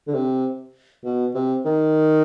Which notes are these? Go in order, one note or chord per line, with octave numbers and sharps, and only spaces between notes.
D3
C3
B2
C3
D#3